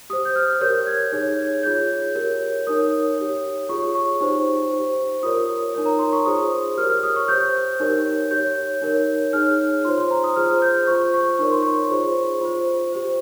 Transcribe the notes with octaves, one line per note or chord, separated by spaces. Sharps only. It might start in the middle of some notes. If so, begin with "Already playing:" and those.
G4 C5 D#6
G6
F6
G4 A#4 C#5 G6
G#6
D#4 G#4 C#5
F4 G#4 C#5 G6
G4 A#4 C#5
D#4 A#4 C#5 D#6
G4 C#5
F4 G#4 C#5 C#6
C#6
D#4 G4 C5
G4 C5
F4 A#4 C#5 D#6
D#4 A#4 C#5
A#5
C6
C#6
F4 G#4 C5 D#6
G4 A#4 C#5 F6
F6
D#6
C#6
G4 C5 G6
D#4 G4 A#4 C#5
G4 C#5 G6
D#4 A#4 C#5
D#4 G#4 C#5 F6
F4 C5 C6
C6
A#5
D#6
F4 G#4 C5 F6
G6
F4 C5 C#6
C#6
D#4 A#4 C#5 C#6
C6
C#6
F4 G#4 C5
F4 C5
G4 C5